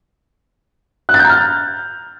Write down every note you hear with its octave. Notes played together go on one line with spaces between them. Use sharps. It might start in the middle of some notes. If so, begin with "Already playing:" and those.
F#6
A6
G6
A#5
F6